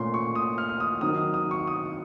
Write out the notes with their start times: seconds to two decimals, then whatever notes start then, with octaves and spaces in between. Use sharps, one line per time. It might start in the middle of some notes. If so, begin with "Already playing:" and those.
Already playing: A#2 A3 C#4 F4 C6
0.14 C#6
0.35 D#6
0.58 F6
0.69 F6
0.80 D#6
1.01 D#3 F#3 C4 D#4 D#6
1.18 D#6
1.34 D#6
1.51 C#6
1.67 D#6